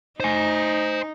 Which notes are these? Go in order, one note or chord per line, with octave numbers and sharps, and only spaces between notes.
D#4 C5 G#5